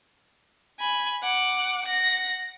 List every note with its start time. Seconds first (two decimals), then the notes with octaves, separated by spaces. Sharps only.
0.79 G#5 B5
1.22 F#5 D6
1.86 F#5 A#6